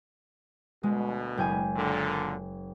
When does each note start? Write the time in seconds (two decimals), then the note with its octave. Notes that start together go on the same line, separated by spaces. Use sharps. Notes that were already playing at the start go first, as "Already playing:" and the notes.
0.83 D2 B2 G#3
1.38 F#1 G5 G#5
1.76 A#2 D3